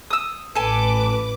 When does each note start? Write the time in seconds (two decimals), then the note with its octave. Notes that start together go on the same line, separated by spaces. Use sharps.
0.11 D#6 E6
0.55 A1 A4 B4 G#5 D6